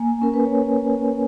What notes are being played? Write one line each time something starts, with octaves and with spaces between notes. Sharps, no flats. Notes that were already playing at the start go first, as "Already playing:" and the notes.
Already playing: A#3 G#5
C#4 A#4
B4
C#5